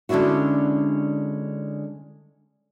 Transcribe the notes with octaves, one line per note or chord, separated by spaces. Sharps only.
D3 G#3 C#4 D4 E4 F#4